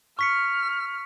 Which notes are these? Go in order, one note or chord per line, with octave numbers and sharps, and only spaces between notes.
C#6 F6 B6 C#7